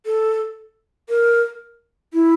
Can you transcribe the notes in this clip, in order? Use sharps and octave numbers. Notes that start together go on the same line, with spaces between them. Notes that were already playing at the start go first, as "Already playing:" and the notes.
A4
A#4
E4